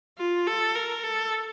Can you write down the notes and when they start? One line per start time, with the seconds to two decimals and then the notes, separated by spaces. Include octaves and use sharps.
0.18 F4
0.47 A4
0.75 A#4
1.03 A4